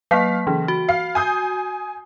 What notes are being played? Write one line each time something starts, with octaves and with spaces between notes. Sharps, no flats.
F#3 A#3 F5 B6
C#3 E3
F#4
F5 C7
G#5 D#6 G6